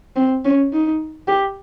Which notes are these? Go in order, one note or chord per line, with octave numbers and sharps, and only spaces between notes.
C4
C#4
D#4
G4